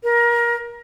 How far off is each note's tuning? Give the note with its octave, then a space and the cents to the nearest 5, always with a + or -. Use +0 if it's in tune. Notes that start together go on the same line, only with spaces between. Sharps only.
A#4 +25